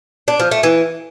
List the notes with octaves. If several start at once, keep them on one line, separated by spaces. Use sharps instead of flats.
D4
F3
A3
E3